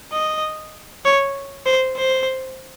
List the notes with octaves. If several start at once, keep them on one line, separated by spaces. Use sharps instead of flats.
D#5
C#5
C5
C5